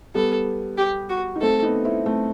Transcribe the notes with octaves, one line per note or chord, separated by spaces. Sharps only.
G3 B3 A4
G4
F#4
D#4
A3 C4 A4
B3 D#4
C4 E4
A3 C4